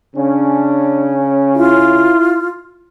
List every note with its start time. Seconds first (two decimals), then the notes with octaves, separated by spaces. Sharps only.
0.16 C#3 C#4 D4
1.56 E4 F4